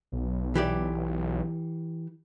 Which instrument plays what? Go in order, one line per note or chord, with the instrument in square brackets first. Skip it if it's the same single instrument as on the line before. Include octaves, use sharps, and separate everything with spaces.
[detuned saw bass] B1
[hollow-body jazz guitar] E3 G4 D5